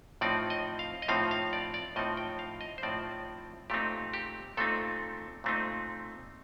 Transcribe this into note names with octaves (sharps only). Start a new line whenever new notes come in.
A2 F3 C4 D#4 D5
D#5
F5
D#5
A2 F3 C4 D#4 F5
F5
D5
D5
A2 F3 C4 D#4 D#5
G5
F5
D#5
C5
A2 F3 C4 D#4 D5
A#2 A3 C4 D#4 G4
G4
A#2 A3 C4 D#4 A4
A#2 A3 C4 D#4